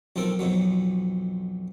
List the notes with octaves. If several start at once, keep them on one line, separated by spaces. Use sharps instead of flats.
B1 F3 C4 A4 A#4
B1 F2 F3 F#3